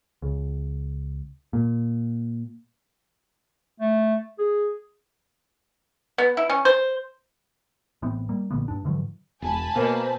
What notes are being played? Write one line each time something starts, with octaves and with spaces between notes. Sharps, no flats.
C#2
A#2
A3
G#4
B3
E4
C#4
C5
A1 E3 B3 C4
G3 A#3
A#1 D3 A#3 B3
G2 D4
G#2 D3 E3 F#3
E1 G#5 A5 B5
B2 A#3 C5